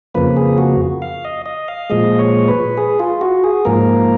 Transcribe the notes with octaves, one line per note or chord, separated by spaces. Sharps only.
F2 C#3 F3 A#3 B4
G#4
F#4
F5
D#5
D#5
F5
A#2 F3 G#3 D#5
C#5
B4
G#4
F4
F#4
G#4
G#2 F3 A#3 A#4